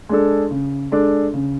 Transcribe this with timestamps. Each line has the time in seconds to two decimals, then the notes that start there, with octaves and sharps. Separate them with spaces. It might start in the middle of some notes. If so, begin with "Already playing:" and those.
0.09 G#3 D4 A4
0.51 C#3
0.92 G#3 D4 A4
1.34 C#3